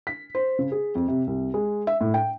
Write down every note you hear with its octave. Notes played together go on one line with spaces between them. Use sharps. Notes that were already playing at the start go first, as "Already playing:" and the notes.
B6
C5
C#3
G#4
F2
C3
C2
G#3
E5
A2
G5